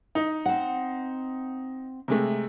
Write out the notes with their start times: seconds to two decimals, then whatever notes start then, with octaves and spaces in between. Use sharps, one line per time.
0.15 D#4
0.46 C4 F#5
2.08 C3 G#3 A3